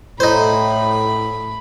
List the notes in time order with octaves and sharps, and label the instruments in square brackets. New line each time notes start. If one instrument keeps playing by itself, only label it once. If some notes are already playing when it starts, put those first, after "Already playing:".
[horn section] A2 [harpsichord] D#4 C5 [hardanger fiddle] B5